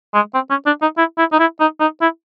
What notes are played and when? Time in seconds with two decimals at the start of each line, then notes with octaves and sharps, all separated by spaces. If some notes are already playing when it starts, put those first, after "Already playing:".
0.14 G#3
0.34 C4
0.50 C#4
0.66 D4
0.82 D#4
0.98 E4
1.18 E4
1.32 D#4
1.39 E4
1.60 D#4
1.80 D#4
2.02 E4